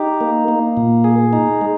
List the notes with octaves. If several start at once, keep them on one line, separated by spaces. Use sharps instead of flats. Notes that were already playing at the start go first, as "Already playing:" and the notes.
Already playing: D#4 G4
A#3
A#3
A#2
G#4
D#4
G#3